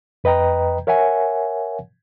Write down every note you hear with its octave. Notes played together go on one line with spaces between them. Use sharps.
F2 B4 D#5 G5 A#5
A#4 C#5 E5 F#5 G#5